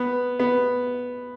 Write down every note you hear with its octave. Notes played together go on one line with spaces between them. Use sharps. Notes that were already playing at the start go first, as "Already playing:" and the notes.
Already playing: B3
B3